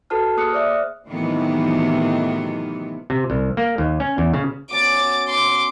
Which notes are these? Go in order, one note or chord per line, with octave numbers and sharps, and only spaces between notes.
F#4 A4 B4 A5 F6
A#3 G#4 D#6 F6 F#6 C#7
C5 D5 E5
A2 C3 D#3 E3 F#3 B3
C3
C2
A#3
D#2
C#4
E2
C#3
B3 C#4 F#4 D6 A6
C6 D6